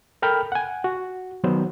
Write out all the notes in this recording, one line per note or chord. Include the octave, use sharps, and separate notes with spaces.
A4 A#4 G5 B5 F6
F#5 G#5
F#4
D#3 F#3 B3 C5